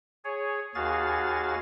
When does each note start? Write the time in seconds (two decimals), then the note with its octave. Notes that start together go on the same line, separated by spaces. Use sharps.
0.24 G#4 C#5
0.75 D#2 F#4 G#4 F5 G#5 A6